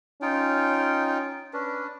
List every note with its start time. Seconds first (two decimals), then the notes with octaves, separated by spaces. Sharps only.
0.22 C#4 D#4 F4 G5
1.54 C#4 D4 B4